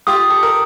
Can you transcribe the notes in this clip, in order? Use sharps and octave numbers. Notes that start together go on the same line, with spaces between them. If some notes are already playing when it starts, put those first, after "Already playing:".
F4 G4 D#6
G4 A4
A#4